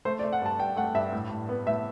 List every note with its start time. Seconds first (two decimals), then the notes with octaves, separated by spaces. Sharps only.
0.05 A3 C5
0.19 D5
0.23 A3
0.33 F#5
0.42 G2 A5
0.60 G2 G5
0.77 A3 F#5
0.94 G2 E5
1.13 A2
1.30 A2
1.49 B3
1.67 A2 E5